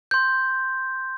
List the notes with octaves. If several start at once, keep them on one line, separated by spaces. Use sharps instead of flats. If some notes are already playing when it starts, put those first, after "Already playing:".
C6 G6